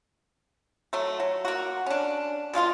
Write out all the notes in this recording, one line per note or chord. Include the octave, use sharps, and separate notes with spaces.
F#3 A3
F#3
A#3 F#4
C#4 D4
B2 G#3 F4 D#5